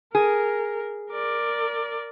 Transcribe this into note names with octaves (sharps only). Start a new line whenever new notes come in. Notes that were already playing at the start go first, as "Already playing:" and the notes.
G#4 A#4
A#4 D5